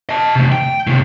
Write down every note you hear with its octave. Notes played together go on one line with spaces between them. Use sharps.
D#5 A5
C3 A3
G5
A2 C3